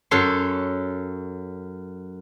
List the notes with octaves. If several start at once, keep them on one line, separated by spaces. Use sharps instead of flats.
F#2 A4 C#5 C6